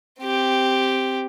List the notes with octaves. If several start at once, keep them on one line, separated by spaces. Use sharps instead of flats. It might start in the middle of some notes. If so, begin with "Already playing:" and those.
C4 G4